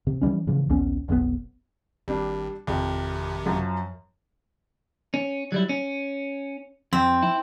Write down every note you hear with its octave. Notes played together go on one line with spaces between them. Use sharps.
C3
E3 F3 G3 C#4
A2 C#3 E3 F3
A#1 D#2 B3 C#4
F1 B1 A2 B3
G#1 G3 D4
G#1 F2 C3
F#2 F3 F#3
C#4
F#3 G3 E4
C#4
F2 C4
E4